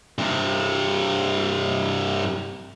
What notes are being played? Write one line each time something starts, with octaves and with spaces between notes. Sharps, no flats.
G2 C3